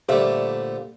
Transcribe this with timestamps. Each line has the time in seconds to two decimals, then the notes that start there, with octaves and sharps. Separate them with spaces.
0.09 A#2 D3 G3 A3 G4 C5 E5 F5